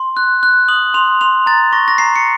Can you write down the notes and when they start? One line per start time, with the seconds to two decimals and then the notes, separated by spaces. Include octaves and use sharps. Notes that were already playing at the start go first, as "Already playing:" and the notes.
Already playing: C6
0.17 F#6
0.43 F#6
0.68 D#6 F#7
0.94 C6 F7
1.21 C6 F7
1.46 A#5 A6
1.73 C#6 A#6
1.88 A#6
1.98 A#5 C7
2.16 C#7